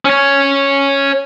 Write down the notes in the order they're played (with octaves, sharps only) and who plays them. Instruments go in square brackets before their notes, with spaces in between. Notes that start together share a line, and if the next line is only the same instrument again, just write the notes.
[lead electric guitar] C#4 C#5